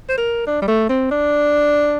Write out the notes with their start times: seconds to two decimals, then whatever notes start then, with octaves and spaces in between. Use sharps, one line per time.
0.09 C5
0.18 A#4
0.47 D4
0.62 G3
0.68 A3
0.89 C4
1.11 D4